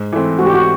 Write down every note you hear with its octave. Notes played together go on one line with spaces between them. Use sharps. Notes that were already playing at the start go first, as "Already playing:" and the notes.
Already playing: G#2
E3 A3 C4
G#2 F#4
G4
F#4